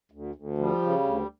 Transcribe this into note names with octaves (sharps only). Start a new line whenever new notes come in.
D2
D2
F3 G3
C#3
D2